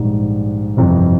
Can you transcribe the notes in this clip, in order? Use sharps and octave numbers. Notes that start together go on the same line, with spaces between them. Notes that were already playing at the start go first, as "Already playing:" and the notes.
Already playing: A#1 G#2 D#3 G3
G1 F2 C3 E3